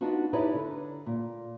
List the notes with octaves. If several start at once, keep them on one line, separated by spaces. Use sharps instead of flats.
B3 D4 D#4 F4 F#4
D#4 E4 G4 B4 C#5 D5
D3
A#2